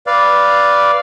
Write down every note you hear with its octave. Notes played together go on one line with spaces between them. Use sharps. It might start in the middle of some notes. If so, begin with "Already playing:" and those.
B4 D5 F5